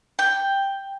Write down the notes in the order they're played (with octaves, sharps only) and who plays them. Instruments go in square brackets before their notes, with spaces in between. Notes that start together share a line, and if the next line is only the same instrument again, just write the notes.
[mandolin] G5